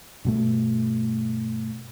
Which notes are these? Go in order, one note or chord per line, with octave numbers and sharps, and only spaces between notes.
G2 B2 A3